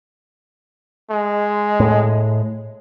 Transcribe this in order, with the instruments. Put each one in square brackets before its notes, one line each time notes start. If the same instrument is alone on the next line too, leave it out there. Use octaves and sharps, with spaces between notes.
[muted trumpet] G#3
[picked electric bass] A2